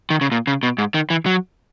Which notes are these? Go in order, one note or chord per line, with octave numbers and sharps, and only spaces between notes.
D#3
C#3
A#2
C#3
B2
G#2
D#3
E3
F#3